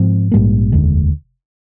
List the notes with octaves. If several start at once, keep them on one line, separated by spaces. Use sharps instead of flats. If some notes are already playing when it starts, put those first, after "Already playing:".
Already playing: G#2 F3 C4
A#1 G#2 G3 A#3
F1 D#2 D3 G#3